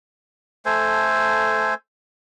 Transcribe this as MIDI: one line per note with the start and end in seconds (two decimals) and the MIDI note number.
0.66 1.74 57
0.66 1.74 69
0.66 1.74 72
0.66 1.74 80